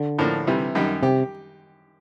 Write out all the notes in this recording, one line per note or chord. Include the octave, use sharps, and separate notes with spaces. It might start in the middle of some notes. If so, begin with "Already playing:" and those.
Already playing: D3
A2 F3 A#3 D4
C3 E3 G3
F#2 D#3 G3
C3 G4